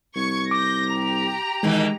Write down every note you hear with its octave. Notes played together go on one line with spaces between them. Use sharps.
C2 C#6 G#6 C#7
D6 G6 A#6
G4 A#5
B2 D#3 E3 G#3